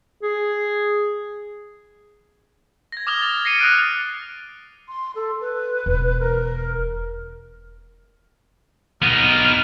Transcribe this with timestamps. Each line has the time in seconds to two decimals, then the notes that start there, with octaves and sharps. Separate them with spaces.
0.23 G#4
2.92 G#6 A#6
3.07 D6 D#6 F6 A#6 F7 G7
3.22 A6
3.45 A#6 C7 C#7 D#7
3.59 D#6 F#6 D7
4.88 C6
5.15 A4
5.41 B4
5.86 E1
6.19 A#4
9.03 B3 D#4 F6